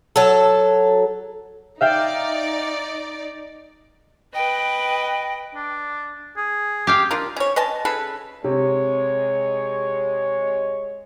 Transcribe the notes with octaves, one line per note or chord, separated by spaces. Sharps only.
F#3 A4
D#4 D5 E5 F5 G5
B4 D#5 G5 F#6
D4
G#4
G4 F5 G5
D4 F4 A#4
C#4 C#5
B4 D#5 G#5 A5
C#3 G#4 A4 B4
C3 G#3 C#5